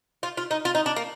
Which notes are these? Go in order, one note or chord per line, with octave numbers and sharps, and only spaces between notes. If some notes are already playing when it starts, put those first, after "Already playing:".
F4
F4
D#4
F4
D#4
D4
A#3